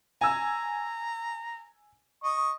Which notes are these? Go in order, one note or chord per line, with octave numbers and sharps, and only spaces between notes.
G#5 A#5 E6
D#5 C#6